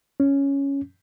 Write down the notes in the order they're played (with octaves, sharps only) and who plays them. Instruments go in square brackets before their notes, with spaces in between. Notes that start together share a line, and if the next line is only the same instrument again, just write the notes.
[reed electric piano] C#4